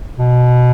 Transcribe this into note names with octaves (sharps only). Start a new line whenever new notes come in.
B2